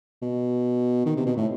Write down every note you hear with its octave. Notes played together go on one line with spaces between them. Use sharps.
B2
D#3
C3
B2
A2